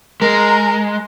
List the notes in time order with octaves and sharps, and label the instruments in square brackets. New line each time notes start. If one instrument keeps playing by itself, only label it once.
[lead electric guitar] G#3 [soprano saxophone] A#4 [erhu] A#5